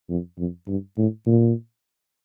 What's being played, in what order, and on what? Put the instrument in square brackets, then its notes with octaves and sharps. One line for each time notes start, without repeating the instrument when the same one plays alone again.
[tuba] F2
F2
G2
A2
A#2